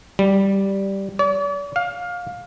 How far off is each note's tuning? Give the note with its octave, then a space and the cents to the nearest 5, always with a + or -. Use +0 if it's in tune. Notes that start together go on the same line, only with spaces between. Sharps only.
G3 -5
D5 -45
F5 +20